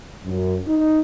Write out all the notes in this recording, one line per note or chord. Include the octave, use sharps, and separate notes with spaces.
F#2
D#4